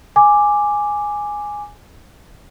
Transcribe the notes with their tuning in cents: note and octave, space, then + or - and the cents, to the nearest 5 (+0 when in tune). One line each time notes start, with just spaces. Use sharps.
G#5 +0 D6 +0